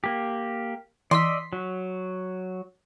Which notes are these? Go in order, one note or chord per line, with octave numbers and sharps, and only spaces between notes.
A#3 G4
E3 D5 D#5 C6 E6 B6
F#3